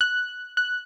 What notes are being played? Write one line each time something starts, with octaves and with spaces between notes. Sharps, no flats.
F#6
F#6